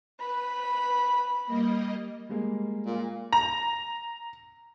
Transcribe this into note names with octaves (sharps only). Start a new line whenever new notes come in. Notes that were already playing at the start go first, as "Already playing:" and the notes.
B4 B5
G3 A#3 D#5
G3 G#3 A#3
A#2
A#5